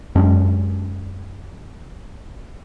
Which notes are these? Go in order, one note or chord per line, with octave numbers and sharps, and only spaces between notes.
F#2 G#3 C#4 D4